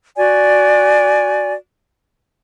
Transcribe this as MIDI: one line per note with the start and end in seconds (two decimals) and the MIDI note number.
0.16 1.53 66
0.16 1.53 74
0.16 1.53 80